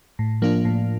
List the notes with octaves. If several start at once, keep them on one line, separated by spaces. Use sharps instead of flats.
A2
F3 A#3 D4 F4
A2